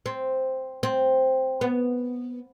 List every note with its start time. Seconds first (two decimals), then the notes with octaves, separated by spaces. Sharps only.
0.06 C4
0.83 C4
1.61 B3